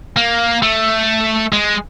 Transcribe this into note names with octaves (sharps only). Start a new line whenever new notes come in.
A#3
A3
G#3